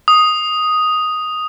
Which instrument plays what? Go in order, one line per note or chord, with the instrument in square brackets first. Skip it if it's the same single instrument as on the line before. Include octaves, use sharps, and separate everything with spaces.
[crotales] D#6